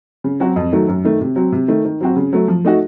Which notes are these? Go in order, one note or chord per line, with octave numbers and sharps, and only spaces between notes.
C#3
F#3 C4 F#4
F2
D#3 F#3 A3
F#2
D#3 A3
C3
F#3 C4
C3
D#3 A3
D#3
F#3 C4 F#4
C#3
F#3 A3
F3
A3 D#4 F#4